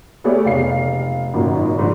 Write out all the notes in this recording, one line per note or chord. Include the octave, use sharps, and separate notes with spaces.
A3 B3 G4 G#4 C#5 D5
F1 F5 C7
G#1 F#2 A#2
G#2 F3 D4